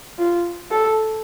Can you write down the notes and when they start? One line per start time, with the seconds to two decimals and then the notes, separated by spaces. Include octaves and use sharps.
0.18 F4
0.71 A4